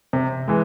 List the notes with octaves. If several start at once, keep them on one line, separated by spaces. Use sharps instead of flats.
C3
E3 G#3